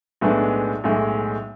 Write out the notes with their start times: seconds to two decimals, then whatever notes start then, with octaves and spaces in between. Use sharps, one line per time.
0.21 B1 A2 G#3 B3 D4
0.84 B1 A2 G#3